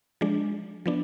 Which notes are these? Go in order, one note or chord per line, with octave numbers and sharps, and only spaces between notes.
F3 G#3 D4
F3 B3 D4